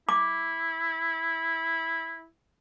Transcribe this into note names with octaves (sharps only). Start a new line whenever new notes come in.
E4 D6